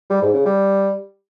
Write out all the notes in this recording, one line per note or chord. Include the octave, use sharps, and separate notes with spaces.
G3
G#2
C#3
G3